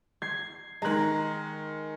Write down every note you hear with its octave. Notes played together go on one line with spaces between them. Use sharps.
G#6 C7
D#3 G#3 A#5 F#6